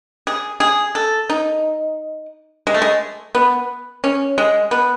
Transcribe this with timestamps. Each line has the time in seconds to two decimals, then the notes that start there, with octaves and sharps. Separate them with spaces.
0.27 G#4
0.60 G#4
0.95 A4
1.29 D#4
2.67 G#3
2.74 A3
2.82 G#3
3.35 B3
4.04 C#4
4.38 G#3
4.71 B3